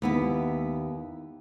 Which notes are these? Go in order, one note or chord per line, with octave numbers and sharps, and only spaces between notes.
D#2 B3 E4